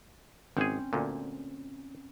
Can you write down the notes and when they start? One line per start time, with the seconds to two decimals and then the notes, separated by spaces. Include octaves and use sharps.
0.57 G#1 C4 C#4 G#4
0.93 D2 A#2